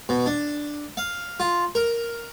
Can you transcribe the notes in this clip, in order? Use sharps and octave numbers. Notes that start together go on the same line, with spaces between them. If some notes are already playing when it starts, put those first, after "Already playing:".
B2
D4
F5
F4
A#4